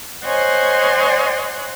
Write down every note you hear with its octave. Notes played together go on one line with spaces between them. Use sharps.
C5 C#5 D#5 F#5 G#5 C6